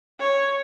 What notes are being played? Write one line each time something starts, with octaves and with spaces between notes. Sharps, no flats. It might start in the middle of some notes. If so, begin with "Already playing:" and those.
C#5